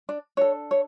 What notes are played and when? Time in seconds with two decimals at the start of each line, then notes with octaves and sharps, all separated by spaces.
0.09 D4 D5
0.37 D4 A4 C#5
0.71 C#5